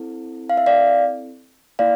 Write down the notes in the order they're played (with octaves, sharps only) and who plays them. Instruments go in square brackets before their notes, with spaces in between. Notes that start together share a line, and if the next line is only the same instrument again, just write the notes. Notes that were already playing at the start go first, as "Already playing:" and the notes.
Already playing: [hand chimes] C4 E4 A4
F5
E5
D5 F5
A#3 E4 D5 F5